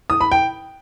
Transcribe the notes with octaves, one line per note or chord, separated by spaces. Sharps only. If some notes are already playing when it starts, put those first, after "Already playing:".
D#6
B5
G5